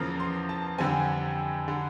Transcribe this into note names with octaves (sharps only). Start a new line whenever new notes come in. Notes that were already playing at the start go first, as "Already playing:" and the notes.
Already playing: E2 C#3 F3 A#3 A#5
C6
A5
F2 D3 G3 C4 G#5
D3 G3